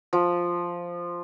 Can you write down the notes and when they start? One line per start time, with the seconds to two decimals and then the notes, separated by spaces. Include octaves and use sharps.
0.13 F3